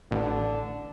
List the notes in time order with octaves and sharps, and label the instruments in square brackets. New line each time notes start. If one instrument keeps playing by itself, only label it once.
[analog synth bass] A1 [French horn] D3